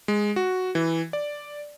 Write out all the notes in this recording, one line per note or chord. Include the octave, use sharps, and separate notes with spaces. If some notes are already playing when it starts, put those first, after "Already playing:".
G#3
F#4
E3
D5